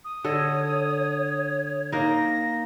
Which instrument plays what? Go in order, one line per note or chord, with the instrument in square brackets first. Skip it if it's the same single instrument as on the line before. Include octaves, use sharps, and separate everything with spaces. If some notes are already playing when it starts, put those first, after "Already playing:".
[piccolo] D#6
[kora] D3 A4 D#5 [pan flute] C#5
[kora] A#3 D#4 [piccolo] A#6